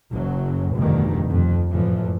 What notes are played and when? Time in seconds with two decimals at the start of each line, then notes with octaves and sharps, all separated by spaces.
0.12 F#1 F#2 F#3
0.74 F1 D2 G2 B2 D#3
1.28 F2
1.69 F#1 A2 E3 F3